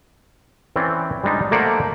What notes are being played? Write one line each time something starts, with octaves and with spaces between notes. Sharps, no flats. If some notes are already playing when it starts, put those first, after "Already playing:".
E3 C4 C#4 D5
G3 G#3 D4 D#4 D#5
A3 A#3 A#4 C5 D5 F#5